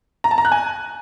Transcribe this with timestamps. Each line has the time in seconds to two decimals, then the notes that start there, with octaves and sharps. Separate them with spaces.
0.24 A#5
0.31 A5
0.38 A#5
0.45 F#6
0.52 G#5